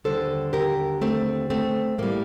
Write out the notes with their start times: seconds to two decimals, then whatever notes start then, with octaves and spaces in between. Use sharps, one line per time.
0.04 D#2 D3 G3 A4 C5
0.53 G4 A#4
1.02 A3 C4
1.50 A3 C4
1.98 A2 G3 A#3